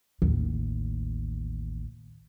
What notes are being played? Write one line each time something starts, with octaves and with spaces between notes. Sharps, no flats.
A1 D#2